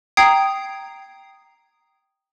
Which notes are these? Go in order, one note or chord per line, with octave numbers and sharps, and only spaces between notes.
G5 A#5 D#6 G#6 C7